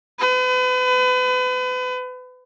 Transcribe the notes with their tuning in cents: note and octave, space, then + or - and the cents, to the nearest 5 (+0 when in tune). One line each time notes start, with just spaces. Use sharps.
B4 +35